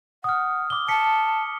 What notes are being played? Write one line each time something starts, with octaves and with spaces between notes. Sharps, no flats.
F#5 D#6 F6
D6 G7
A5 B6 C#7